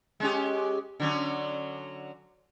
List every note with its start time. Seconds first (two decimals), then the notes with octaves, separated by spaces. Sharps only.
0.20 G#3 C#4 G4
1.00 D3 F#3 C#4